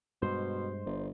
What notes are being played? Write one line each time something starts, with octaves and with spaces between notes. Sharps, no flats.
G2 B2 G#3 C5 C6
G1